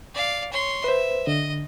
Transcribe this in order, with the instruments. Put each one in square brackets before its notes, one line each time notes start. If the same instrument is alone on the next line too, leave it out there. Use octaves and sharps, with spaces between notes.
[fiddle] D5 F5
C#5 C6
[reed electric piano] B4 C5 [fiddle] E5
[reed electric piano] D3 [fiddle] D#5